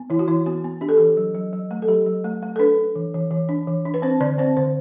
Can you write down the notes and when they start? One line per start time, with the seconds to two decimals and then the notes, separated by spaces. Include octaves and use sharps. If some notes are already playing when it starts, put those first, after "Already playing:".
Already playing: B3
0.10 E3 E4
0.19 F#4
0.28 E3 E4
0.46 B3 F#4
0.64 B3
0.81 D4 G4
0.89 A4
0.97 E3 G4
1.17 F#3
1.35 F#3
1.53 F#3
1.71 A3
1.82 A4
1.88 F#3 G4
2.07 F#3
2.25 A3
2.42 A3
2.56 A4
2.59 D4 B4
2.78 D4
2.96 E3
3.14 E3
3.31 E3
3.49 D4
3.67 E3
3.85 D4
3.94 B4
4.02 C4 C5
4.20 D3 D5
4.38 C4 C5
4.57 D3 C5